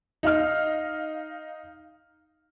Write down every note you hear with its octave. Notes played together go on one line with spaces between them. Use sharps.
D#4 F5 F6